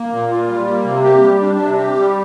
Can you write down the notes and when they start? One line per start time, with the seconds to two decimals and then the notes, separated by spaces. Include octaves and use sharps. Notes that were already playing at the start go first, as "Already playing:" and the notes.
Already playing: A#3
0.13 A#2
0.31 F4
0.49 G3
0.68 A#3
0.85 C3
1.03 G4
1.22 G3
1.41 D4
1.58 C3
1.77 G4
1.96 G3